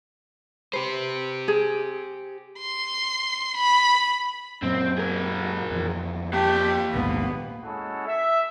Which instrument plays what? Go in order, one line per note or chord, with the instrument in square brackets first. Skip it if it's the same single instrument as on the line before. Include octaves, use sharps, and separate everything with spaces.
[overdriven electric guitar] G4 C5 [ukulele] B4
[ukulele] G#4
[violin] C6
B5
[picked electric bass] F#2 A#2 F#3 [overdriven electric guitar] C4
[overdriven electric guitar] G#4 A#4
[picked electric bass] F2 E3
[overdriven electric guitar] A#3 A5 [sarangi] G4
[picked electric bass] A#1 D#2 G#2 [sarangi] B3
[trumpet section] G#3 C#4 E4 F#4 A4
E5